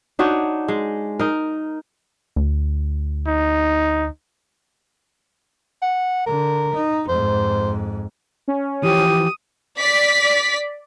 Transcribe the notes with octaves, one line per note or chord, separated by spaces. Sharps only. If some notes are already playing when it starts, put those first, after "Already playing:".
D4 D#4 F#4 C#5
G#3
D#4 A#4
D2
D#4
F#5
D3 A#4
D#4
F2 G#2 C5
C#4
E3 F3 G4 D#6
D5 B6